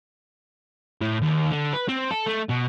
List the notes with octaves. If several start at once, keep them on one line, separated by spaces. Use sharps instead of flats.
A2
D#2
D3
B4
C4
A4
A3
B2